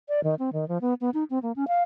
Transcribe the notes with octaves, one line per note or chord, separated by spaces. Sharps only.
D5
D#3
C4
D#3
F3
B3
B3
D#4
C4
A#3
C#4
F5